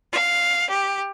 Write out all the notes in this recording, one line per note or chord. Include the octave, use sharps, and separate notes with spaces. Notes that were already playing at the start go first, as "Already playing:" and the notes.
F5
G4